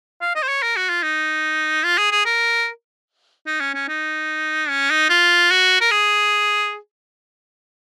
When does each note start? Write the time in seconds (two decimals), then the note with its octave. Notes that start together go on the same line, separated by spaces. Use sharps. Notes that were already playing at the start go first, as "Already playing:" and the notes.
0.21 F5
0.35 D#5
0.43 C5
0.48 C#5
0.63 A#4
0.76 F#4
0.89 F4
1.03 D#4
1.84 F4
1.98 G#4
2.12 G#4
2.25 A#4
3.47 D#4
3.61 C#4
3.74 C#4
3.88 D#4
4.69 C#4
4.90 D#4
5.10 F4
5.51 F#4
5.81 A#4
5.91 G#4